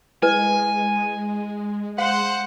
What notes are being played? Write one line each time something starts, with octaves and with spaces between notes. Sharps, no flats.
G#3 E4 B4 D#5 G#5
C5 F5 F#5